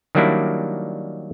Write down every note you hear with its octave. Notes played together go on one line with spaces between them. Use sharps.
D#3 F#3 G3 A#3 D4 E4